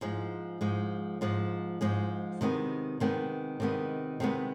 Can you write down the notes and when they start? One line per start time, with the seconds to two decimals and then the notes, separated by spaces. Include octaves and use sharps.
0.01 G#2 F3 G#3
0.61 G#2 F3 G#3
1.21 G#2 F3 G#3
1.81 G#2 F3 G#3
2.41 C3 D#3 G#3 B3
3.00 C3 D#3 G#3 B3
3.60 C3 D#3 G#3 B3
4.20 C3 D#3 G#3 B3